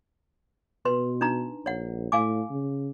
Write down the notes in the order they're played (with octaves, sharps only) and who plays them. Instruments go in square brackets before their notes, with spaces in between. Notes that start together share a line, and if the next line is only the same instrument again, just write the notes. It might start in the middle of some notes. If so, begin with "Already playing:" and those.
[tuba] B2 [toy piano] B4 C6
[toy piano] D4 D#4 A#5
[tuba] A#1 [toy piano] C#5 F#5
[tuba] A2 [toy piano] F5 G#5 D6
[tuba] C#3